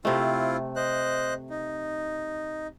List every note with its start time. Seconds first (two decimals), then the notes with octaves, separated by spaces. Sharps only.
0.05 C3 A3 C4 E4 F4
0.76 C5 D#5 F#6
1.50 D#4